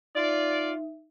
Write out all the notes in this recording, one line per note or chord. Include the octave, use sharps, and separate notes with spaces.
D#4 F4 D5 E5